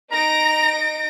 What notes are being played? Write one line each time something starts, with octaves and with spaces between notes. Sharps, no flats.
D#4 A#5 A#6 D7